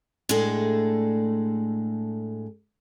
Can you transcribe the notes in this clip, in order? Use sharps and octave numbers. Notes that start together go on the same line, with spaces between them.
A2 G#3 A3 D4 G#4 A4